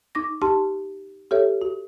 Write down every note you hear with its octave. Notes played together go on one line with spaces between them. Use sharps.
D#4 D6 A#6
D#4 G4 A5 C6
G4 A4 C#5 E5
F#4